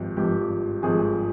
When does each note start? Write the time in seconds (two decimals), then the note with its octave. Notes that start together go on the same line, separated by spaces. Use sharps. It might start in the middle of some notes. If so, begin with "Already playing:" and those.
Already playing: G#1 G2 F3
0.17 G#1 G2 F3 G4
0.83 G#1 G2 F3 G#4